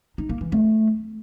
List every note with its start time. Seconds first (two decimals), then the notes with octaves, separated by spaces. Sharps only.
0.18 D#4
0.30 A#3
0.41 E3
0.52 A3